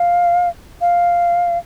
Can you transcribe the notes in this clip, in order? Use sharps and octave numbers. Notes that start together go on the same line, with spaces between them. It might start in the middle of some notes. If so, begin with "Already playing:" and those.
Already playing: F5
F5